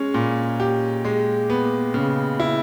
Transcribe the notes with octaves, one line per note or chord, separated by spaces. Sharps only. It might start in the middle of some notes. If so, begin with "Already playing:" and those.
Already playing: G#3 C#4
A#2
G4
G#3
B3
C#3
E4